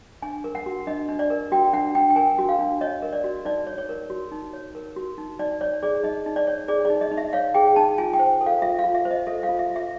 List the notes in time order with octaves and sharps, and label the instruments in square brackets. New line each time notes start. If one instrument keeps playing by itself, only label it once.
[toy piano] D4 G#5
A#4
F#5
F#4
D4 D#5
D4
D5
A#4
F#4 G5
D4 F#5
D4 G5
G5
A#4 G#5
F#4
F5
D4
C#5 D#5
A#4
D5
F#4
D#4 D5
C#5
C#5
A#4
F#4
D#4
C#5
A#4
F#4
D#4
D#4 D5
C#5 D5
G#4 D5
D#4 D#5
D#4
D5
C#5
G#4 D5
D5
D#4
D#5
D#4
E5
C#5 F5
G#4 G5
D#4 A5
F4 G#5
G5
C5
A4
F5
F4 E5
F5
F4
E5
C5
D#5
A4 E5
F5
F4
E5
F4
E5